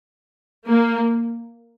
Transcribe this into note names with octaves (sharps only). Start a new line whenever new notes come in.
A#3